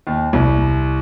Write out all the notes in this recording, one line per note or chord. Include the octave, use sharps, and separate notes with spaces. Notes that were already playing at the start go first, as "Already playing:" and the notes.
D#2
C2